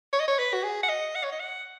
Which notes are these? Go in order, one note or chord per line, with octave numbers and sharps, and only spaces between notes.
C#5
D#5
C#5
B4
F#4
G#4
F#5
D#5
F#5
C#5
D#5
F#5